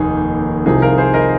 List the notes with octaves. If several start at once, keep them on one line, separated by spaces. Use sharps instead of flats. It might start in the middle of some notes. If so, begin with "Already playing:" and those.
Already playing: F1 D#2 D#3 D#4 G#4
C2 C3 F3 D#4 G#4
F4 A#4
G#4 C5
A#4 D#5